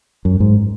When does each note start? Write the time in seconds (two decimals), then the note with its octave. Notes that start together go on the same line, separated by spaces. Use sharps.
0.25 F#2
0.40 G#2